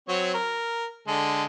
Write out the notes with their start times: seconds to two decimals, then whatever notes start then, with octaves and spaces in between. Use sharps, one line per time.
0.09 F#3 C4 C#5
0.34 A#4
1.08 D3 G#3 A4